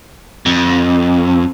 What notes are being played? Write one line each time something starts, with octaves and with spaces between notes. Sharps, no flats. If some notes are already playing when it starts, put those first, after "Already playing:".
F2